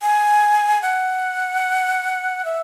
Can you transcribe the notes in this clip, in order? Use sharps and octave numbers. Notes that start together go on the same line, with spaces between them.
G#5
F#5
E5